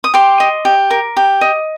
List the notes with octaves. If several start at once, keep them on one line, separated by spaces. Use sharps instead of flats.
D#6
G4 C6 D6
D#5
G4
A#4
G4
D#5